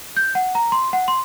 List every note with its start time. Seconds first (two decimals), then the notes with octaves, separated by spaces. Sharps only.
0.17 G6
0.35 F#5
0.55 A#5
0.72 C6
0.93 F#5
1.08 C6